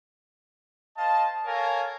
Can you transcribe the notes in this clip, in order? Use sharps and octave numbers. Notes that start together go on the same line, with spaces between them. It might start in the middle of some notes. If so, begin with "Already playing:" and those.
C5 D#5 F5 A5
A4 A#4 C#5 F5 G#5 A#5